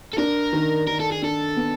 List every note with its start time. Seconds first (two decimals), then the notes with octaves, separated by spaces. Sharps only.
0.13 A4
0.18 D4 A#4
0.53 D#3
0.87 D#3 A#4
1.00 A4
1.12 G#4
1.22 D4 A4
1.56 B3